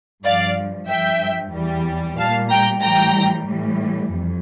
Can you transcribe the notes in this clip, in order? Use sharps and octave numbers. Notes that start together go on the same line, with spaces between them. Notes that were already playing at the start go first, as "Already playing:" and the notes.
G2 F3 D5 F5
G2 F3 E5 G5
E2 E3 G3
A#2 G3 F5 A5
G5 A#5
A2 E3 G3 G5 A#5
A2 E3 G3
F2